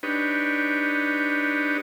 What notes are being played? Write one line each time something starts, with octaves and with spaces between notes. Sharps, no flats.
D4 D#4 G4 B4 C#5